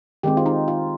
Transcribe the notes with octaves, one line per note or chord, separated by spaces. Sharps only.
D#3 G#3 C4 G4
F4
D#4
F4